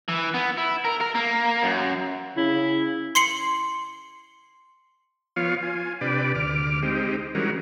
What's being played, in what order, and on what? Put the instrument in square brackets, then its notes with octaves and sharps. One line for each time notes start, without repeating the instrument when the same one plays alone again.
[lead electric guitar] E3
B3
E4
A#4
A#4
A#3
F#2
[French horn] C#3 [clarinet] E4
[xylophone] C6 C7 C#7 F#7
[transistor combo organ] F3 B3 F4 C#5 F5
F4 G#5
C3 D4 G4 B4 D5
D2 D6 F6
G#3 C4 D#4 G4
E3 G3 G#3 C#4 F#4 A#4